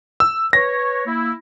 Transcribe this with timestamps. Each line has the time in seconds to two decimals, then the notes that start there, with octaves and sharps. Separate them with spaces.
0.20 E6
0.53 B4 C#5 A#6
1.06 A#3 E4